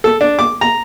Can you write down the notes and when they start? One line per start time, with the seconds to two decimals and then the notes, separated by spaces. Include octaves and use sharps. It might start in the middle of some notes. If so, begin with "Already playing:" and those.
0.04 A4
0.21 D4
0.39 D6
0.61 A#5